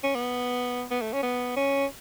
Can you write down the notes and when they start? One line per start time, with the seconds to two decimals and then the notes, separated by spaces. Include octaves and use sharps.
0.03 C#4
0.15 B3
0.91 B3
1.01 A3
1.13 C#4
1.23 B3
1.56 C#4